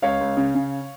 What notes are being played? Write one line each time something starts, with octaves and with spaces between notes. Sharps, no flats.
C#2 C#5 F5
C#2
C#3
C#3